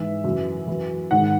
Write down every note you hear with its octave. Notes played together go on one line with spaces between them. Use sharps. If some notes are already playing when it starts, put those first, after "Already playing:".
Already playing: G#2 E3 E5
F#2 E3
F#2 E3
G#2 D#3 F#5